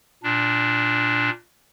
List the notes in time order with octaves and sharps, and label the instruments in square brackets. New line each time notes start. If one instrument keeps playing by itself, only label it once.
[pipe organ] A#2 D4